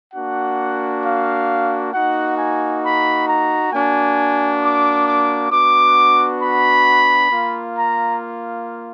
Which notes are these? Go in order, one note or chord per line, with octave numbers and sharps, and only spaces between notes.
A#3 D4 F#4 F#5
F5
A#3 D#4 F#4 F#5
G#5
B5
A#5
A#3 D4 F#4 G#5
D6
D6
B3 D4 F#4 D6
B5
A#3 F4
A#5